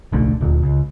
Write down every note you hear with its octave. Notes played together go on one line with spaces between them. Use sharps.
D1 B1 D3 A3
D#1 D2
C#2